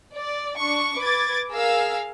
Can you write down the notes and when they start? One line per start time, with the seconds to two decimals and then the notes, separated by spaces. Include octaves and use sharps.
0.15 D5
0.57 D4 C#6
0.99 B4 D6 G#6 A6
1.51 G#4 A#4 F5 E6